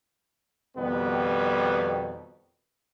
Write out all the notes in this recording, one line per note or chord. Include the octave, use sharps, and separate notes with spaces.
F2 B2 D#3 G3 B3